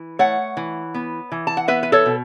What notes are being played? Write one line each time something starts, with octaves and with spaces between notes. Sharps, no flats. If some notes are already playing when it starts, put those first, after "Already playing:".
Already playing: E3
A3 C#5 F#5
E3
B3
E3
A5
F#5
B3 B4 E5
B4
A4 C#5
B2